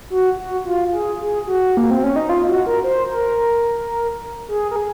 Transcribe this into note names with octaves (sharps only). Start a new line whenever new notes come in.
F#4
F#4
F4
G#4
G#4
F#4
A#3
C4
C#4
D#4
F4
F#4
A#4
C5
A#4
G#4
A#4
G#4